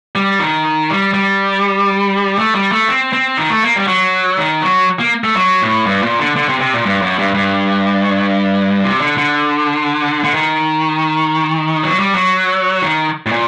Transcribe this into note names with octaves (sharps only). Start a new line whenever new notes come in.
G3
D#3
G3
G3
A3
G3
A3
C4
C4
D#3
A3
A#3
G3
F#3
D#3
F#3
A#3
A3
F#3
A2
G2
A#2
D3
D3
C3
C3
A#2
G2
F#2
G2
G2
C3
D3
D3
D3
D#3
F#3
G3
F#3
D#3
A2
A#2